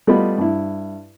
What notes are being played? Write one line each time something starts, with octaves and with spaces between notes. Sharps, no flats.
G3 A3 B3 F4 D#5 B5
G2 E4